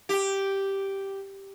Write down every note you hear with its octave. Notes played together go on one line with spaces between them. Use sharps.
G4